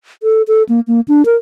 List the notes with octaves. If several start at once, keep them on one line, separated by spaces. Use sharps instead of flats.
A4
A4
A#3
A#3
D4
A#4